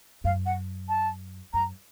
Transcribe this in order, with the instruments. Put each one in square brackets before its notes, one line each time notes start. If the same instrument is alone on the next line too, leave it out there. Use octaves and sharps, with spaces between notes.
[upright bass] F#2 [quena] F5
[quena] F#5
A5
[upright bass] F#2 [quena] A#5